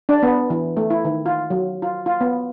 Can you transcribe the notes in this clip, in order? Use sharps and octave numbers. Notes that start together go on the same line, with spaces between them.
D4
B3
E3
A3
E4
D#3
F4
F#3
F4
F4
B3